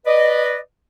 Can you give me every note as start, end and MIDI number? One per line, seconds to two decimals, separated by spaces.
0.06 0.58 71
0.06 0.58 74
0.06 0.58 75